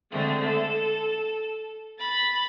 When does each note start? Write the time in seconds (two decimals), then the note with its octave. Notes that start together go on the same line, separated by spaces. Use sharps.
0.11 D3 G#3 A3 C4
0.47 A4
1.98 B5 A6